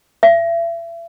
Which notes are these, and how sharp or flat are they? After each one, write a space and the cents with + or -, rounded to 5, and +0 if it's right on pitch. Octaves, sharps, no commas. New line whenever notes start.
E5 +35